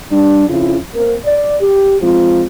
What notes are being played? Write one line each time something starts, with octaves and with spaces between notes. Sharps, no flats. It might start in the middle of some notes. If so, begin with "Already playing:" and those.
G3 D4
F2 C#3 C#4 E4 F4
A#3 C4 A#4
D5
G4
F3 G#3 C4 F4